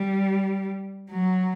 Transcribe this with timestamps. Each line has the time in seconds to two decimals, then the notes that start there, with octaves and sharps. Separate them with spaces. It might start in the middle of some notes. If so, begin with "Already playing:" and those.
Already playing: G3
1.10 F#3